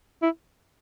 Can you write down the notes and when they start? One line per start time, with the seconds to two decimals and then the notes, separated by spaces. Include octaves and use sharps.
0.22 E4